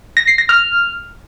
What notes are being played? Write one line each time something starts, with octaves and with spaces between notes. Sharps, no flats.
A#6
C7
A#6
F6